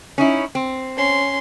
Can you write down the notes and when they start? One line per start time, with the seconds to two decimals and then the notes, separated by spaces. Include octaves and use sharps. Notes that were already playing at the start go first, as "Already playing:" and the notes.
0.18 C#4 D#4 E4
0.55 C4
0.96 C#4 C6